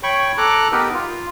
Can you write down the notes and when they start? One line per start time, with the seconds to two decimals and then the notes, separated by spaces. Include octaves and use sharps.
0.03 C#5 G5 B5 C#6
0.38 A4 A#5 D6 F#6
0.72 B3 D#4 G4 A#4 B4
0.94 F4